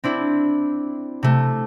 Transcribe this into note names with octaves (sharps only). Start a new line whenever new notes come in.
C4 D4 E4
C3 A3